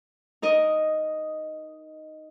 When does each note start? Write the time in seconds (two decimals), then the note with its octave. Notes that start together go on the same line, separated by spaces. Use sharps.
0.42 D#4 A#4 D#5